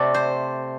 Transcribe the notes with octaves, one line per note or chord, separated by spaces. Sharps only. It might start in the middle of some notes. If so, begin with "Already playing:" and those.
Already playing: C3 A3 C4 D5
C5